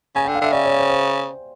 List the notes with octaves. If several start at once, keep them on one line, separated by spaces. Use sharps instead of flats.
C#3 G#5
G5
D3
F5
D3 E5
C#3 D5
C#5
C5
C5